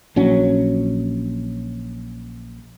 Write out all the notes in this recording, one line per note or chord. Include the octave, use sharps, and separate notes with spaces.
A#1 F#3 C#4